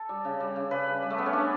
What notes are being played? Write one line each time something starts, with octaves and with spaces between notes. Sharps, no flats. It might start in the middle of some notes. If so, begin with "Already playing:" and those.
Already playing: A4
G3
C#3
G3
C#3
C#3 B4
G3
G3
A3
C#3 B3
C#4
G3 D4